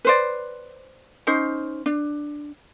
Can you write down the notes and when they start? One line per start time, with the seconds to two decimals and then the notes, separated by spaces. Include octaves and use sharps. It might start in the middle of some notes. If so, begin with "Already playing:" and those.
0.05 B4 C5 D5
1.27 C#4 D#4 C5
1.86 D4